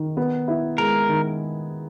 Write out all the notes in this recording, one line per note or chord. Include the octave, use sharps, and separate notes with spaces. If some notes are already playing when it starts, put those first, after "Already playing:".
Already playing: D#3
B3
E4
G#3 A#4
D#3